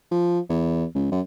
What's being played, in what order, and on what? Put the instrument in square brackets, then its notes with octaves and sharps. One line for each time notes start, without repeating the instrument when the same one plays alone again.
[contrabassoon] F3
E2
C#2
F#2